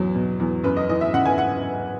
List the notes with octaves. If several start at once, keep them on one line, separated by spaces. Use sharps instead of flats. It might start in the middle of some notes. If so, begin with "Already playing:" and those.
Already playing: E2 F#3
B2
E2
F#2 B4
D#5
E3 D#5
E5
C#3 F#5
G#5
F#5